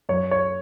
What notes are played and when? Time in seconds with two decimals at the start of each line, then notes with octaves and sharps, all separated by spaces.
0.09 F#2 C#5
0.31 C#5